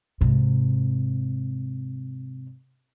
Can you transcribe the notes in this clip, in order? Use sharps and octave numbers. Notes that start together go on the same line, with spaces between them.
G#2 C3